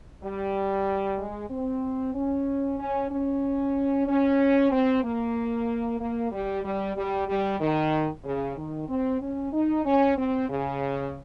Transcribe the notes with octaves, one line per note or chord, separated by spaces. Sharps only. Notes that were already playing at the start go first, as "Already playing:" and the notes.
G3
G#3
C4
C#4
C#4
C#4
C#4
C4
A#3
A#3
G3
G3
G3
G3
D#3
C#3
D#3
C4
C#4
D#4
C#4
C4
C#3